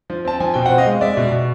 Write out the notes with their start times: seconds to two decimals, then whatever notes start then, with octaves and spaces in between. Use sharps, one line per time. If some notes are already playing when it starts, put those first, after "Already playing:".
0.10 F3
0.25 C4 A5
0.40 F3 G#5
0.54 B2 G5
0.66 C4 F#5
0.78 D#5 F5
0.87 G#3
1.01 G#3 D5 E5
1.17 B2
1.32 B2